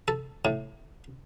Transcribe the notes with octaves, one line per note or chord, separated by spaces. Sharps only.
A4
A2